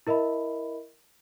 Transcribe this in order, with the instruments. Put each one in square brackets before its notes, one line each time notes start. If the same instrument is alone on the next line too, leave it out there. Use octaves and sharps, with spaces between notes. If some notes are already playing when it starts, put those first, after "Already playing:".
[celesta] E4 A#4 D#5 E5 B5